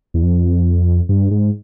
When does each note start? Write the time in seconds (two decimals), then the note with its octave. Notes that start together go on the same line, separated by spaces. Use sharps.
0.14 E2
0.23 F2
1.09 G2
1.31 G#2